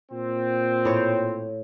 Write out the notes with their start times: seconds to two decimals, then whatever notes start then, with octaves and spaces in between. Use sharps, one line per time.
0.12 A#2 C4
0.85 A2 C#5 F5